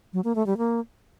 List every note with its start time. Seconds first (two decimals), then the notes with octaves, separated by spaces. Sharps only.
0.13 F#3
0.24 A#3
0.35 A3
0.47 G3
0.58 A#3